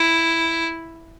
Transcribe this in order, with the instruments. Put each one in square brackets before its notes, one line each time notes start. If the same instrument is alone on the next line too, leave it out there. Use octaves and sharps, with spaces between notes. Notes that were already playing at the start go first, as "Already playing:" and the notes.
Already playing: [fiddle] E4